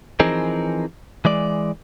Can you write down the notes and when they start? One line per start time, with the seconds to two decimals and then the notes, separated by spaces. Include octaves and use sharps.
0.20 E3 F3 C4 D#4 G#4 A#4
1.25 E3 G#3 D5